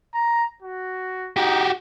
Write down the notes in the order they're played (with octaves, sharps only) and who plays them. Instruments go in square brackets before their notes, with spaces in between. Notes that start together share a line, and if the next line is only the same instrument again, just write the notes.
[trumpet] A#5
F#4
[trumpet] D#4 [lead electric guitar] F#4 G4